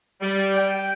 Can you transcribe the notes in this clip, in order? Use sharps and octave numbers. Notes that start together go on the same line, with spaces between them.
G3
G5